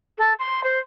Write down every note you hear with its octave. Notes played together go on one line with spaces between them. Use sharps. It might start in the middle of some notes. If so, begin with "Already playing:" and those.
A4
C6
C5